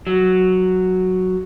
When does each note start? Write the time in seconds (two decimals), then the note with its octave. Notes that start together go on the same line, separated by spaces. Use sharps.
0.07 F#3